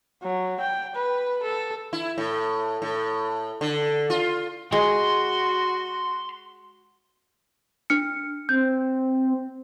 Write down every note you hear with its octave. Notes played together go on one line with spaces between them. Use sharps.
F#3
G5
B4
A4
E4
A2
A2
D3
F4
G#3 F#4 F#5 C6
D4 F6 C#7
C4 G6